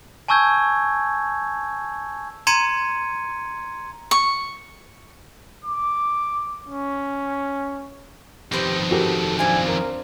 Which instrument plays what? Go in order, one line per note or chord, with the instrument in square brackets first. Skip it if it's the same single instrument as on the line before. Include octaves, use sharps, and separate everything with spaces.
[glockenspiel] G#5 A5 C#6 E6 G6 G#6
A#5 C6 G#6 C#7 D#7
[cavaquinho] C#6
[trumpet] D6
C#4
[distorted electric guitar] F2 D#3 [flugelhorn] G4 [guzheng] B4 C5 G5
[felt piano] F#4 G4 A#4 [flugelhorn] A4
[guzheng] C4 D4 F4 [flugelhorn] G#5
[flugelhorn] A#4